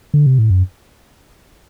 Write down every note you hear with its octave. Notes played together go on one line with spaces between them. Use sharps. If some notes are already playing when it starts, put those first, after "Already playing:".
D3
C3
A2
F#2